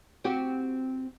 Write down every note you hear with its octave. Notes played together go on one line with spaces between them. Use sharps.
C4 F#4 G4